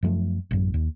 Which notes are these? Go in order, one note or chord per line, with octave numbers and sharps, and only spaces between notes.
F#2 F3 A3
A1 F#2
D#2